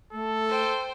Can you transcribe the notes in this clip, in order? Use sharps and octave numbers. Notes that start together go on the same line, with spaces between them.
A3 A4
C5 G5